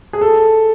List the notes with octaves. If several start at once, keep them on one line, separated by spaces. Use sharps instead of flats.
G#4
A4